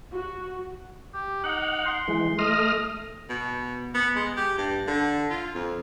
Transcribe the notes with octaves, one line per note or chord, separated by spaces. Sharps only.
F#4
G4
D#4 F#5
C6
E3 G#3
A3 D#5 D#6 F6
B2
B3
G#3
G4
G2
D3
F4
F2